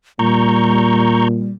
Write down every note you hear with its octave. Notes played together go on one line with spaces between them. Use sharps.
A#2 G3 A#5 C#6 G6